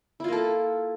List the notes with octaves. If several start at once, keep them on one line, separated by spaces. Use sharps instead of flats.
A#3 E4 F4 A4